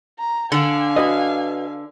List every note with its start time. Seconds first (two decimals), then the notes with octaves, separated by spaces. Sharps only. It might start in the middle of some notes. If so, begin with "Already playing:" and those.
0.19 A#5
0.52 D3 D4 F5 G#5
0.96 F#4 B4 D#5